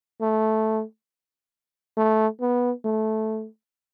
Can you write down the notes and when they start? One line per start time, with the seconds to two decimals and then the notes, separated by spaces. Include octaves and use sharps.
0.21 A3
1.97 A3
2.41 B3
2.85 A3